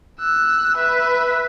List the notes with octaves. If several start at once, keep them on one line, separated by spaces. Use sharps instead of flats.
E6 F#6
B4 E5